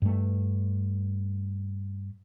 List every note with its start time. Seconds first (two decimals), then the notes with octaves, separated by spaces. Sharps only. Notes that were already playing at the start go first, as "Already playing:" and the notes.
0.02 G2 A3